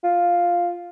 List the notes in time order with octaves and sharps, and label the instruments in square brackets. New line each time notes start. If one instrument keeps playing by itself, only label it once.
[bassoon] F4